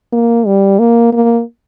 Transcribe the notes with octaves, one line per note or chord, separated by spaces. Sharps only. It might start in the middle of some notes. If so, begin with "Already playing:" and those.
A#3
G3
A#3
A#3